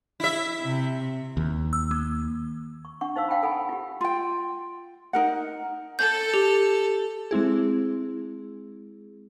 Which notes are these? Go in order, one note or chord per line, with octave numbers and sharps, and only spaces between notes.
E4 E5
C3
D#2
E6
A#3
C#6
D4 F#5 C#6
D#4 C5 F5 E6
F5 G5 A5 B5
A4 F#5 G#5 B5
F4 G4
F4 G5
D#4 A#4 F#5
A4 G6
G4
G#3 C4 E4 G#4